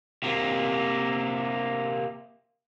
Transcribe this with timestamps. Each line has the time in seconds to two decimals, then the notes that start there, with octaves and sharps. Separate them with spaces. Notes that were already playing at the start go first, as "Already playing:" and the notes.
0.23 C3 A#3